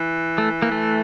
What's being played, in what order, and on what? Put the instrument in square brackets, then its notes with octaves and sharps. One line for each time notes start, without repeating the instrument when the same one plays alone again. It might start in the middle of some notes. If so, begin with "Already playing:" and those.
Already playing: [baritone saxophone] E3
[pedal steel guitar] A3
A#3
A3